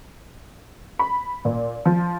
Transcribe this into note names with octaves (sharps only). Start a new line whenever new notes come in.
B5
A#2
F3